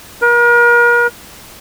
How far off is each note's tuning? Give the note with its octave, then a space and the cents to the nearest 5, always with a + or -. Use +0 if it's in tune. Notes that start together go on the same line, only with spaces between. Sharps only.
A#4 +40